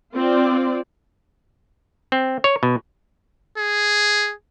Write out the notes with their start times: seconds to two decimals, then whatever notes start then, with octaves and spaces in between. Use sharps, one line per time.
0.14 C4 F4 D5
2.12 C4
2.44 C#5
2.63 B2
3.58 G#4